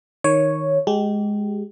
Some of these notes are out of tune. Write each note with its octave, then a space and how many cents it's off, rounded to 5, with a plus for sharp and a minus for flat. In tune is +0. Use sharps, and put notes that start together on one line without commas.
D#3 +0 C#5 +0
G#3 +0 G4 -25